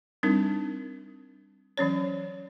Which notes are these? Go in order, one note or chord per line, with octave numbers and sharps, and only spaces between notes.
G3 C4 D4 D#4 A#4
E3 F#3 C#4 C#5